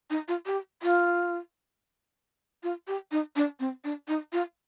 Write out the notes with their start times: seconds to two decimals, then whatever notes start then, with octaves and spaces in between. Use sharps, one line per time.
0.10 D#4
0.28 F4
0.46 G4
0.83 F4
2.63 F4
2.87 G4
3.12 D#4
3.36 D4
3.60 C4
3.84 D4
4.08 D#4
4.32 F4